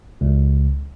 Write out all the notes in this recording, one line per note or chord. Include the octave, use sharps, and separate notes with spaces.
C#2